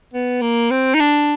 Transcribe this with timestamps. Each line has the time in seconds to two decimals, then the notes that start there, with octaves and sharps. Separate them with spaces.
0.14 B3
0.42 A#3
0.71 C4
0.94 D#4
1.00 D4